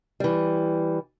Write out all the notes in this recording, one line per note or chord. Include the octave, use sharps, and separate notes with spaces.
E3 G3